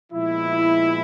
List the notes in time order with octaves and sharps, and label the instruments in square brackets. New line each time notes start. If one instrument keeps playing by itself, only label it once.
[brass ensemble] A#2 F3 G#3 B3 E4